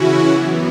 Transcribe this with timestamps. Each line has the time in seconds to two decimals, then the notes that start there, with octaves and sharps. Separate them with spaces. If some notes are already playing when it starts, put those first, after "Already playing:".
Already playing: C#3 E3 C#4 E4 F#4
0.27 F#2 E3 B3